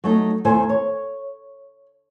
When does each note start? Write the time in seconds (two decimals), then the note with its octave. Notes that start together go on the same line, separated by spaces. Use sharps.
0.04 F#3 A3 D#4
0.45 E2 D#3 A3 C5 G#5
0.69 C#5